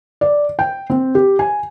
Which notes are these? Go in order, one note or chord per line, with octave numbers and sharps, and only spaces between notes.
D5
G5
C4
G4
G#5